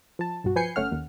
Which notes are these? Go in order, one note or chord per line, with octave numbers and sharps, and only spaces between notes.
F3 A5
B1 G2 F#4
F3 B4 G#5 G6 C7 C#7
G1 A3 C#4 F#5 F6
D#2